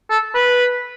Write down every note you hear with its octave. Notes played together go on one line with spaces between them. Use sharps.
A4
B4